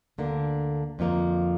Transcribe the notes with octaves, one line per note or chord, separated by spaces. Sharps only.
D2 D3 A#3 D4
F2 D3 F3 A#3